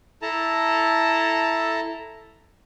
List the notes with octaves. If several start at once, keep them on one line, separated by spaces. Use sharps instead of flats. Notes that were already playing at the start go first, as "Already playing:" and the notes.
E4 A4 A5 A#5